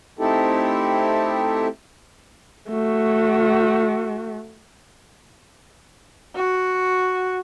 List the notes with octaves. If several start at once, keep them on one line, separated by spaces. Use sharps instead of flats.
A3 C4 D#4 E4 G4 A4
A3 F#4
F#4